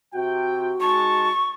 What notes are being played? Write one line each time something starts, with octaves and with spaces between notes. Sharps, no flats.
C3 F#4 G5
G#3 D#4 A5 C#6